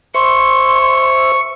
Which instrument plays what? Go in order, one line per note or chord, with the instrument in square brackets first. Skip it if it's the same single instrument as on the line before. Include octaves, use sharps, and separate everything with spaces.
[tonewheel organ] C5 E5 [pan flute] C6 [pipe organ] C#6